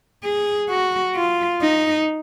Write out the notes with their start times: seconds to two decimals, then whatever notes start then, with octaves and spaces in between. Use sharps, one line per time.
0.24 G#4
0.69 F#4
1.16 F4
1.61 D#4